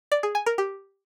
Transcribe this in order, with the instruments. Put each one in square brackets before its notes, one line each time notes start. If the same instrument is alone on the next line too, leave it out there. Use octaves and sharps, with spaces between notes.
[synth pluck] D5
G#4
G#5
A#4
G4